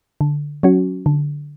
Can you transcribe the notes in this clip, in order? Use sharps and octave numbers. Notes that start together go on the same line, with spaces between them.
D3
F#3 C#4 F#4
D3